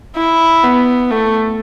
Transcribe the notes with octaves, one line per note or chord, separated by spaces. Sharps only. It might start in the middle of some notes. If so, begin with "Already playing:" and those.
E4
B3
A3